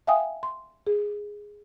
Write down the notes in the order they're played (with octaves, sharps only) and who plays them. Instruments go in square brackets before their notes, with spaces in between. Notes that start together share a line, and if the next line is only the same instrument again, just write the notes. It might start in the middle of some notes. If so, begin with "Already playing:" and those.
[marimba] E5 F5 G5 G#5 D#6
C6
G#4